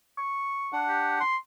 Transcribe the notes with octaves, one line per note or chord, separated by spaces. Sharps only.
C#6
D4 F#5
G4
C6